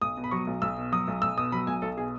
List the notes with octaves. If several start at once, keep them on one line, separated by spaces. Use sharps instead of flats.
B1 D#6
B2
B5
F#3 C#6
B1
B1 E6
B2
F#3 D#6
B1
B1 E6
B2 D#6
F#3 B5
B1 G#5
B1 A4
B2 G#4